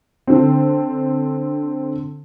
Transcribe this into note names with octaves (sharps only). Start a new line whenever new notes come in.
D3 C4